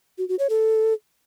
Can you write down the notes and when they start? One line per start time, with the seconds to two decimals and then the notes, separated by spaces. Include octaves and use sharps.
0.18 F#4
0.29 F#4
0.39 C#5
0.50 A4